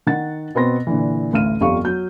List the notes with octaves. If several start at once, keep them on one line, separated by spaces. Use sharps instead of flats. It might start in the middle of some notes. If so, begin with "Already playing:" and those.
D#3 F#5 A6
B2 B3 C4 C6 A#6
A#2 D3 E3
A1 D2 F5 F6 D#7
G1 F2 G3 F5 C#6
F#3 G6